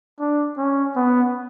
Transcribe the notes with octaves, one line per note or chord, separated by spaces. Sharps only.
D4
C#4
B3